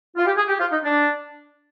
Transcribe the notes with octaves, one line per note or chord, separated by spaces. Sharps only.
F4
G4
G#4
G4
F4
D#4
D4